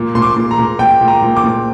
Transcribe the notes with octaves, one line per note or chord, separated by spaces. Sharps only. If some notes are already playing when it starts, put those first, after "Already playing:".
Already playing: A#2
A#2 C6
D6
A#2
A#5
A#2
A#2 G5
A#2
A#5
A#2
D6
A#2